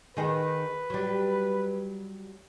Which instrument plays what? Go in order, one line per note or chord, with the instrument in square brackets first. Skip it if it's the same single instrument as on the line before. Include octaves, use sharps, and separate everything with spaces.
[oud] D#3 D#4 G#4 [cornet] B4
[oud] F#3 G3